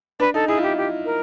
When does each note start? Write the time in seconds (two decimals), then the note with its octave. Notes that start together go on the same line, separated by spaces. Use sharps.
0.20 D4 B4
0.34 D#4 A4
0.48 E4 G#4
0.58 F4
0.62 E4 G4
0.77 G4
1.05 A#4